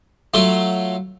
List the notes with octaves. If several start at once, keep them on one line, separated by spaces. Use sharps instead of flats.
F#3 A3 F4